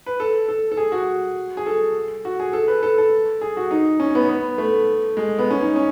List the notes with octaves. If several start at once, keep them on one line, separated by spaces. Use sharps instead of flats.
B4
A4
A4
A4
G#4
F#4
G#4
A4
F#4
G#4
A4
B4
A4
A4
G#4
F#4
D#4
C#4
B3
B3
A3
G#3
B3
C#4
D#4
C#4